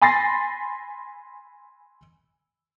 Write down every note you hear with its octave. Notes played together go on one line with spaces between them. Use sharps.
G#5 B5 C6 A6 A#6 C7